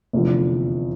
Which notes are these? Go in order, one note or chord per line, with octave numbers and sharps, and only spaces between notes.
F1 E2 D3 F3